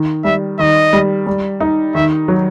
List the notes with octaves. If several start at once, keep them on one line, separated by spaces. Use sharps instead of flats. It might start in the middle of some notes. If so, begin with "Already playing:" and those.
Already playing: D#3
G3 E5
D#3 D#5
G3
G3
D#4
D#3 E5
F#3